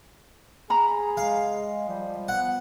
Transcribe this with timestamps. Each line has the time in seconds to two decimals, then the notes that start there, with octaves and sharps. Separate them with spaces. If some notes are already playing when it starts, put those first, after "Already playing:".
0.70 G#4 A#5 B5
1.17 G#3 F5
1.88 F3 G3
2.28 B3 F#5